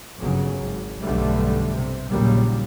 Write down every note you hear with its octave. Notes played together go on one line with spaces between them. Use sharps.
G1 F#2 C#3 F#3
G#1
B1 G2 D3 G3 A3
C3
A#1 D#2 A#2 C#3 F#3 G3